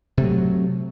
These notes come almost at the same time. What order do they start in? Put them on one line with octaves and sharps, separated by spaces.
C3 A3 F#3